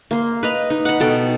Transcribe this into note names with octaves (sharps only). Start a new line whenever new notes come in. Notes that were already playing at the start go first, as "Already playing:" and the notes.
A#3 C6
B4 D#5 A#5
D#4
F#5 B5
B2 A4 G5